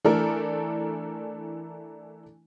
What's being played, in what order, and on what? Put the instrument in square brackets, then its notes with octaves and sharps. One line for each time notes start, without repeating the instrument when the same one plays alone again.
[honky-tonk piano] E3 A3 D4 E4 A4 A#4